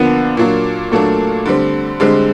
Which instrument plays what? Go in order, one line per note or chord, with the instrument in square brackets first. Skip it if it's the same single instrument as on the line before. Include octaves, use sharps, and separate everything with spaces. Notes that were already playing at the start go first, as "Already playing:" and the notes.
Already playing: [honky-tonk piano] D3 F3 A#3 D4 [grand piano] B3
[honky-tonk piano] A#2 F#3 A#3 D4
[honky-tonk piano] A#2 F#3 A#3 D4 [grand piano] A3
[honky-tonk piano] D3 G3 C4
[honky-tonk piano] D3 G3 C4 [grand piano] G#3